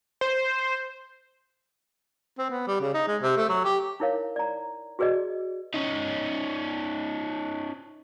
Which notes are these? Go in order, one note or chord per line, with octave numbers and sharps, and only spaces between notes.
C5
C4
B3
G3
C#3
D#4
G#3
C3
A3
F#3
G4
D#4 E4 A#4 C#5 F5
D5 A#5
F#4 G#4 B4 D5 D#5
C#4 D#4